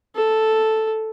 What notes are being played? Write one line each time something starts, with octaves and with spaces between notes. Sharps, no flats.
A4